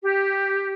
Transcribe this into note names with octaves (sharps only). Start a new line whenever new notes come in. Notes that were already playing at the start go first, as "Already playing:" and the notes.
G4